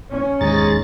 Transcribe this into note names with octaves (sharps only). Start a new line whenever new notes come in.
C#4
D#2 G#2 G#3 G#4 A#5 A6